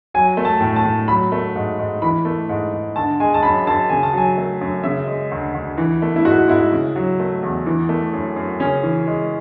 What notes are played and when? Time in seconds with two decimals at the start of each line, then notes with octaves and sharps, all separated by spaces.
0.14 F#3 G#5
0.37 A3
0.45 A5
0.60 A2
0.76 A5
0.85 A2
1.08 F#3 B5
1.32 A3
1.56 G#2
1.79 G#2
2.02 E3 B5
2.25 A3
2.49 G#2
2.72 G#2
2.96 D3 A5
3.20 G#3 G#5
3.34 A5
3.43 F#2 B5
3.67 F#2 A5
3.89 C#3 G#5
4.03 A5
4.13 F#3 G#5
4.37 A3
4.61 F#2
4.83 C#3 E5
5.07 G#3
5.31 D2
5.54 D2
5.77 E3
6.02 A3
6.16 E4
6.25 G#2 F#4
6.48 G#2 E4
6.72 C#3
6.96 F#3
7.19 A3
7.43 E2
7.66 E3
7.89 A3
8.13 F#2
8.36 F#2
8.60 C#3 C#4
8.83 E3
9.07 G#3